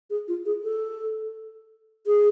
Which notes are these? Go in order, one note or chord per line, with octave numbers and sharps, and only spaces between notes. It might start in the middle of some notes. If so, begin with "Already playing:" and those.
G#4
F4
G#4
A4
G#4